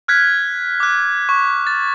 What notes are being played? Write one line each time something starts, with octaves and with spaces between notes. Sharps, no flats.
F6 F#6 G#6 B6
D6 F#6
C#6
A6